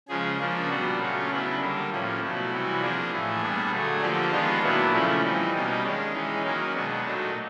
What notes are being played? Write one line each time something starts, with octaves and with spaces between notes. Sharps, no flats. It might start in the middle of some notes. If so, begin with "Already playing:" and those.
C#3 F3 G#3 G#4
C#3 F3 A#3 D4
A#2 G3 B3 D4 F#4
C#3 F#3 A3 C#4 F4
C#3 F#3 B3 D4 E4
D3 G3 A#3 D4
A2 F3 A#3 C#4
B2 F#3 A3 E4
C3 E3 G3 F#4
F3 A#3 D4 G#4
A2 E3 A3
A#2 G3 B3 D4
D3 F#3 A3
D3 F3 A#3 G4
D#3 G#3 B3 D4 F4
A#2 F#3 B3 D4 E4
C#3 F3 A3 C#4 E4
E3 G3 C4 D#4
B2 G3 A#3 C#4
D#3 G#3 C#4 D4
E3 G#3 C#4 D#4
D#3 F#3 A#3 C#4 D#4
B2 G#3 B3 D4
A#2 F#3 A3 D4